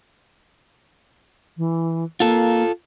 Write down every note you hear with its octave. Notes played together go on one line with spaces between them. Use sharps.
E3
A#3 F4 A4